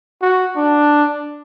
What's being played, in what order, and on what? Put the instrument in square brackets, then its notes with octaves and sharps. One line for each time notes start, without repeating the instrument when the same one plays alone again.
[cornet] F#4
D4